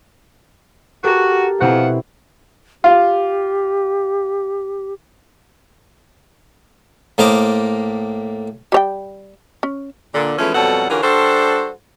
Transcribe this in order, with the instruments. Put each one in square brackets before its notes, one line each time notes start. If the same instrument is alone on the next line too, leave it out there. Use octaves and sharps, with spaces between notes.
[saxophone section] F#4 [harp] G4 A4 A#4
[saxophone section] F2 F3 F#5 [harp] B2 C4 E4
[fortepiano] F4 [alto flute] G4
[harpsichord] A2 A#3 C5 D#5 A#5 D6
[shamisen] G3 C#5 G5
C#4
[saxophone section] A#2 D3
E3 F3 G#3 A3 B3 C#4
F2 B2 F#3 G3 A4 F#5
D3 E3 C#4 F4 G4 A#4
G3 D4 F#4 A4 C5